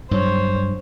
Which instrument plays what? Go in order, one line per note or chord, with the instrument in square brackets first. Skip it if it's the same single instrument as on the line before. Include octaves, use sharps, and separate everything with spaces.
[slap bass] G2 F#3 [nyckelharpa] C5 C#5